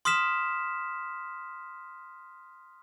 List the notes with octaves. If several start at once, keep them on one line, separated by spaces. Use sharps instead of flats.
C6 D#6 F6 B6 E7